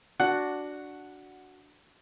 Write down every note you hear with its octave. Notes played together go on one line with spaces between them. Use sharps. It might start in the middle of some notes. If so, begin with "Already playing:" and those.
D4 F#4 F#5